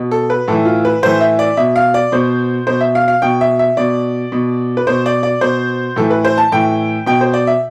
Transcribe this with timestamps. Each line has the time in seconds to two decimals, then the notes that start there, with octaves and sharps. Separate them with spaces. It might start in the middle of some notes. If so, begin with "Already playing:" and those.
Already playing: B2
0.11 A4
0.30 B4
0.48 A2 E3 A4
0.65 F4
0.85 B4
1.03 A2 E3 C5
1.21 E5
1.39 D5
1.57 B2 E5
1.76 F5
1.94 D5
2.12 B2 C5
2.67 B2 C5
2.81 E5
2.95 F5
3.08 F5
3.22 B2 G5
3.41 E5
3.59 E5
3.77 B2 D5
4.32 B2
4.77 B4
4.87 B2 C5
5.06 D5
5.23 D5
5.41 B2 C5
5.96 A2 E3 A4
6.10 B4
6.25 C5
6.38 A5
6.52 A2 E3 G5
7.06 B2 G5
7.21 C5
7.34 D5
7.47 E5